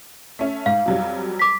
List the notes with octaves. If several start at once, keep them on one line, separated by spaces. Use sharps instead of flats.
A3 C#4
G#2 F5
F2 F#3 G3
D6 B6